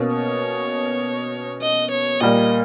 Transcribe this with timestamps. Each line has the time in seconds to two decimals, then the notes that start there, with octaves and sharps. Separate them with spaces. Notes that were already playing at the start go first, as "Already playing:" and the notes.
Already playing: B2 A#3 C#4
0.16 C#5
1.62 D#5
1.91 C#5
2.20 A#2 G3 A#3 D#5